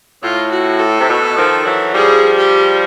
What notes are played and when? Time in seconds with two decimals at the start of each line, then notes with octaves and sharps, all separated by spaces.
0.22 A2 F4
0.51 F#4
0.79 A4
1.00 C3
1.08 B2
1.36 D#3 F3
1.65 E3 F#3
1.94 F3 G3 G#4
2.37 G4